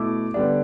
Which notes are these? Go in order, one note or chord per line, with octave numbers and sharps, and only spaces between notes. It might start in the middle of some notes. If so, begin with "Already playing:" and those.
Already playing: B2 A3 E4 D6
D3 G3 B3 D4